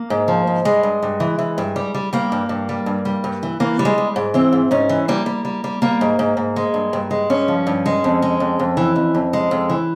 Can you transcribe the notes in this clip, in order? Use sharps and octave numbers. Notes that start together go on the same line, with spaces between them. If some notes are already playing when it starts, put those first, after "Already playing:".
Already playing: A#3
G#2
F3
G#2
G3 G#3
G2
G2
E3
E3
G2
G3
G3
G3 A#3
G2
G2
G3
G2
G3
G2
E3
E3 A#3
G3
G#3
G3
G#2
E3 C4
G#2
G#2 C#4
E3
G3 A#3
G3
G3
G3
G3 A#3
G#2
G#2
G#2
G#3
G2
G2
G#3
G2 C#4
F3
G2
G#3
F2
G#3
F2
F2
E3
F2
F2
G#3
F2
E3